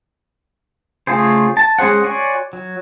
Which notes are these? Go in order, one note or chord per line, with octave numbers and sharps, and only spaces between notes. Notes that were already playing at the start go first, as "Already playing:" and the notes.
C#3 A3 F4 G#4 C5
A5
G#3 C#4 G#4 C5 F#5
F#4 C#5 D5 G#5 C6
F#3